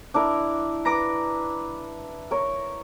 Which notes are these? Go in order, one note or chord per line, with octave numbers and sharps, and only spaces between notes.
D4 E4 A#4
B4 A#5 D6
A#4 C#5